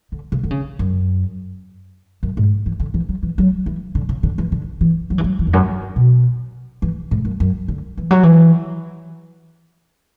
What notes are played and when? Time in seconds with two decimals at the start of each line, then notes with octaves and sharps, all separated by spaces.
0.12 D3
0.32 C#3
0.43 D3
0.51 C#3
0.79 F#2
2.23 F#2
2.37 G#2
2.66 E3
2.80 D3
2.94 E3
3.09 F#3
3.23 E3
3.38 F#3
3.66 E3
3.95 D3
4.09 C#3
4.23 D3
4.38 E3
4.52 D3
4.81 E3
5.10 F#3
5.18 E3
5.24 F#3
5.39 E3
5.47 E2
5.53 F#2
5.96 B2
6.82 E3
7.11 G#2
7.25 F#2
7.40 F#2
7.68 D3
7.97 E3
8.11 F#3
8.23 E3